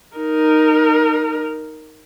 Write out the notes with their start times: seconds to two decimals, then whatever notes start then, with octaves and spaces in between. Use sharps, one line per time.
0.17 D#4 A#4